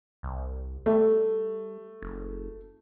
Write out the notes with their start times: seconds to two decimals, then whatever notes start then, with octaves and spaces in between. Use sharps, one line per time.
0.23 C2
0.86 G3 A3
2.02 F#1